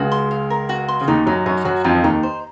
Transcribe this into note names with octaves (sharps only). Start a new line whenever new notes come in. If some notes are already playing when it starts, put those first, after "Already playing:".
Already playing: C#2 C#3 F#4
C6
F5
A#4
F#4
C6
C#3
D#2 D#3 D#4
F#2 F#3 D#4
F#2 F#3 C#5
F#2 F#3 F#4
F2 F3 D#4
F3
D#2 D#3 D#4
C5